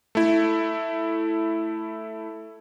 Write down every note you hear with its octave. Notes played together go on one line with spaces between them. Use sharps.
A3 E4